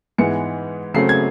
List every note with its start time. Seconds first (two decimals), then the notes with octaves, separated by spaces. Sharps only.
0.18 G#2 E3 G#3 B3 C#7
0.94 C#3 F#3 A3 C4 C7
1.09 G#6